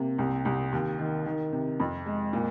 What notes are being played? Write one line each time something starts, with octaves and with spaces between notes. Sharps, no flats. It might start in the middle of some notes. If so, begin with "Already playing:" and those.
Already playing: C3 A#3
C2
C2
D#2
D#3
D#3
C3
F2
G#3
A#2